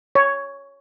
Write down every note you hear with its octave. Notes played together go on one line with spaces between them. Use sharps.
C#5